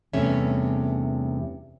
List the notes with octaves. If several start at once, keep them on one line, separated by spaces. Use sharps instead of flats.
E2 G2 C3 A3 C#4 E5